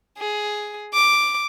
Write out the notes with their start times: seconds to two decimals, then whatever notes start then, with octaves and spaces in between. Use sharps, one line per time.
0.18 G#4
0.93 D6